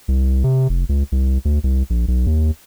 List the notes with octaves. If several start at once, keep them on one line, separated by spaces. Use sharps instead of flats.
C2
C3
F1
C#2
C2
D2
C2
A#1
B1
D#2